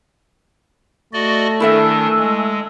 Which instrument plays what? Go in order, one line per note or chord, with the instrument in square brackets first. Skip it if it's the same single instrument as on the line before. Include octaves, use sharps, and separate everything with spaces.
[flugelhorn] A3 [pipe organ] F#4 D5 D#5
[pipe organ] D#3 D4 [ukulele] E4 A4 E5 [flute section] G#5 E6
[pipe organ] G#3